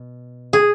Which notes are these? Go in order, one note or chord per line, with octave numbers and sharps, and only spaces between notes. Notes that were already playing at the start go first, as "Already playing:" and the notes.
Already playing: B2
G#4